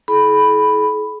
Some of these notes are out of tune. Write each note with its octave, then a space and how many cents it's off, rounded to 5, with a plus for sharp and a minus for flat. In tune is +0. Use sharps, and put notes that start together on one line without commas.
E4 +0 G#4 +45 B5 +0